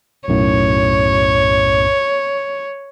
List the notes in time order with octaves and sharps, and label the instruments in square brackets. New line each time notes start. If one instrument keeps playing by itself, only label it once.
[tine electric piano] B1 F#2 A2 [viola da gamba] C#5